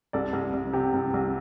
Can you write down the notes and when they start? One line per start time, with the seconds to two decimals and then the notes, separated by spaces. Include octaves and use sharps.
0.13 C2 A4 D5
0.33 C2
0.53 C2
0.73 C3 G4
0.94 C2
1.14 C2